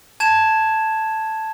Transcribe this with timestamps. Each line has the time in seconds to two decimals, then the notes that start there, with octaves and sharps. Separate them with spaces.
0.20 A5 G#6 E7